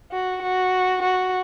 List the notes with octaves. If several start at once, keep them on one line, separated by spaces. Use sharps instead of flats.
F#4
F#4
F#4